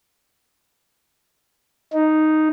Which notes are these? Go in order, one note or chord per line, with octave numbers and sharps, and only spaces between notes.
D#4